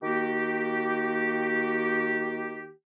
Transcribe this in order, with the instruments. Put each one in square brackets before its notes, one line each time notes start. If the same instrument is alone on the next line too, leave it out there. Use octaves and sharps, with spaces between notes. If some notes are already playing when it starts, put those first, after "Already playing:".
[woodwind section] D#3 A#3 F#4 G4